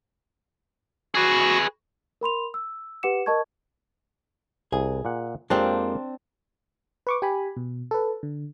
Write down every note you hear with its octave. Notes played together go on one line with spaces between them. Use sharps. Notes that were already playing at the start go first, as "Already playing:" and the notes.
F#4 G#4 B4
A#4 B5 C6 F7
E6
G4 B4 F#5 D6 C#7 E7
A#4 D#5 A5 C#6 G#6
C2 G#4
A#2 F#5
F2 F3 G#3 A#3 C4 D4 G4
B4 C#6 D6
G4 G#5 B5
B2
A4 B4
D3